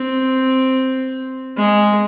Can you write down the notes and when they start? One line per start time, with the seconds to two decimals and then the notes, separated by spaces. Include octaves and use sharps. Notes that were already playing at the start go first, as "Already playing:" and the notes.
Already playing: C4
1.57 G#3